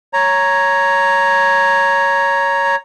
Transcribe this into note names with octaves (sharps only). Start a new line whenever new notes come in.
C#5 A#5